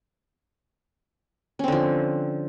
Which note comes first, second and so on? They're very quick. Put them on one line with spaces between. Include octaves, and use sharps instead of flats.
C#4 C4 D3 F3